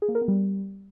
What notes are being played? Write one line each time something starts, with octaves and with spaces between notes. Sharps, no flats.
G#4
A#3
A#4
B3
G3